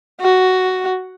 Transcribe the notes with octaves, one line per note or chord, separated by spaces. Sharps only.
F#4